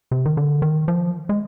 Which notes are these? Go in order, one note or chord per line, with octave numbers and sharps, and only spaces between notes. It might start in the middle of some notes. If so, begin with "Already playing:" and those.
C3
D#3
D3
D#3
F3
G#3